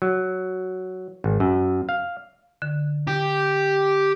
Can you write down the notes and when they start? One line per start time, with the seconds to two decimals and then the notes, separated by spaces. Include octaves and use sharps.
0.02 F#3
1.24 G#1
1.40 F#2
1.89 F5
2.62 D3
3.07 G4